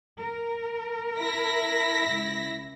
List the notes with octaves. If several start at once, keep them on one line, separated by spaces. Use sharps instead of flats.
A#4
E4 A#6 B6
C#2